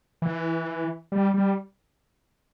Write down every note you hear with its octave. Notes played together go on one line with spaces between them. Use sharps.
E3
G3
G3